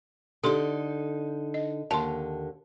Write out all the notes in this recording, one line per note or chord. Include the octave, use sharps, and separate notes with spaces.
D3 D#4 G4 A4 C6
D#5
D#2 D3 A5 C6